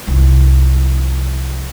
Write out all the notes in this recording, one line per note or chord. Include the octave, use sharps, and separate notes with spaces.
C2 F2